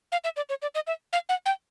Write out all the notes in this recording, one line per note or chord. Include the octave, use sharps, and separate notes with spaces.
F5
E5
D5
C#5
D5
D#5
E5
F5
F#5
G5